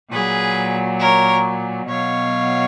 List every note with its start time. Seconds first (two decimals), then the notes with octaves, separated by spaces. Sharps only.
0.11 A#2 F#3 G#4 B4
0.99 A#4 C#5
1.87 B2 F#3 C#5 F5